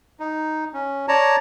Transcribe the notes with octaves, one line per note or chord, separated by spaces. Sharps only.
D#4
C#4
C#5 D5 A5 A#5